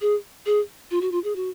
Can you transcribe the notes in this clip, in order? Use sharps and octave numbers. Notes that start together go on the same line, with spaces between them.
G#4
G#4
F4
F#4
F4
G#4
F#4